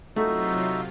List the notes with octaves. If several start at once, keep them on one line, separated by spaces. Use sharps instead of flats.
C3 F#3 A3 D#4 F4 F#4 E5